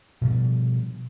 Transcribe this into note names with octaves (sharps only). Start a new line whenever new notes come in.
B2 F3 G3